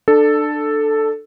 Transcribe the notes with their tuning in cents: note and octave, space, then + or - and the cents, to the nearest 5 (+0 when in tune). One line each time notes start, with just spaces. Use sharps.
D4 +25 A4 +0